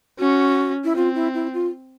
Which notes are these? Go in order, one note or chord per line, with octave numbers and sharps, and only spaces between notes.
C#4 F#4
E4
C4 F4
E4
E4
F4